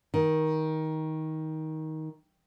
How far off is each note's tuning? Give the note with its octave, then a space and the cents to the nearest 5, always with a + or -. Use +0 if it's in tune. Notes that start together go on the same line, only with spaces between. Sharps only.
D#3 +15